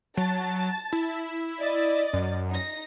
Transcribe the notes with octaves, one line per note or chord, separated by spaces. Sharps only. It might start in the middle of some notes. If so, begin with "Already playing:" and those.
F#3 A5 A6
E4
D5 D#5 A6
F#2
D#4 A#6